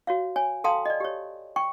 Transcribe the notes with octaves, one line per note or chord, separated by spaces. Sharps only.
F#4 C#5 F5
C#5 G#5
A4 F5 G5 A5 C6 D#6
D5 D#5
G4 C#5
G5 C#6